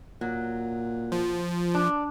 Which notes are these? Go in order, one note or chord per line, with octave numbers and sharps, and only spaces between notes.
A#2 F#3
F3
D4